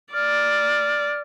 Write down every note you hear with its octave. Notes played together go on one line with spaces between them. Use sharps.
D5 F6